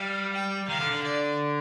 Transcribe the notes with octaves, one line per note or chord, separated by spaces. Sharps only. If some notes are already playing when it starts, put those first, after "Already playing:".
Already playing: G3 F5
G5
D#3 F5
D3
D3
D5